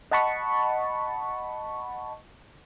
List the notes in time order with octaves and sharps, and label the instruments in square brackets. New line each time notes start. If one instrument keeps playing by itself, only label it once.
[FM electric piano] D#5 F#5 A5 B5 C#6